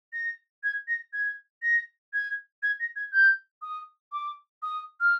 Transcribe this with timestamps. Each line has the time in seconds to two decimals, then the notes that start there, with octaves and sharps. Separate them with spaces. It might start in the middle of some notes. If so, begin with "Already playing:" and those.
0.13 A#6
0.63 G#6
0.88 A#6
1.13 G#6
1.62 A#6
2.13 G#6
2.63 G#6
2.80 A#6
2.96 G#6
3.13 G6
3.62 D#6
4.12 D6
4.62 D#6
5.00 F6